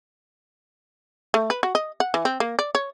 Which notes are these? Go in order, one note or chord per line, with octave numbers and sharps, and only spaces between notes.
A3
B4
F#4
D#5
F#5
E3
C4
A#3
D5
C#5